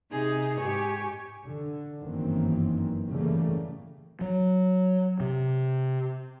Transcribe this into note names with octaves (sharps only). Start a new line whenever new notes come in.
C3 D#4 G#4
G#2 G4 G#5 C#6
D3
G1 F#2 D#3 E3 A#3 C4
C#3 E3 G3 A3 A#3
F#3
C3